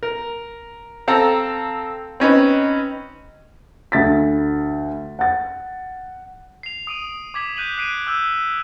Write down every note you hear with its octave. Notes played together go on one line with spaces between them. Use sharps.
A#4
C4 A4 F5 A#5
C4 C#4 D#4 B4
D2 A6 B6
F#5 A6
C7 F7
D#6 D7 D#7 F#7
D6 G#6 B6 F#7
F#6 G6 B6 D#7 F#7
F#6 B6 C7 D7 D#7
D6 E6 G6 F#7